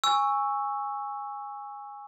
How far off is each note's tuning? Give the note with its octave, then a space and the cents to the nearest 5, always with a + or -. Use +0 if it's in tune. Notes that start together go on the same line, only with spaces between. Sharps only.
G#5 -15 C#6 +0 E6 +0